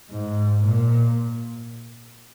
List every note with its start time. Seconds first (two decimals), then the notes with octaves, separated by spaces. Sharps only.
0.11 G#2
0.64 A#2